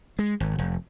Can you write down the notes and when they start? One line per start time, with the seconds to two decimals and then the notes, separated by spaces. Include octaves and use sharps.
0.19 G#3
0.40 G#1
0.59 F1